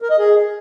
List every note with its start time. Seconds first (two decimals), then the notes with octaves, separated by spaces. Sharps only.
0.02 A#4
0.10 D#5
0.19 G#4